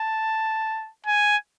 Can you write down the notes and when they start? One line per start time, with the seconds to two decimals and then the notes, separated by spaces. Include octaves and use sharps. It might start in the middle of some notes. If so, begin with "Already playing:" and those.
Already playing: A5
1.06 G#5